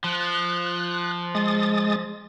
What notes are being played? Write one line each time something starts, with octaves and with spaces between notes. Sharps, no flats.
F3 F#6
G#3 D#6 A6